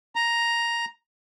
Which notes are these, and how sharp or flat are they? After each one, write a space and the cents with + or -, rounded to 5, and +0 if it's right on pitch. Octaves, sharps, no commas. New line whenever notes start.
A#5 +5